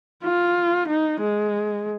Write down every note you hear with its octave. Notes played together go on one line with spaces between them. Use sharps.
F4
D#4
G#3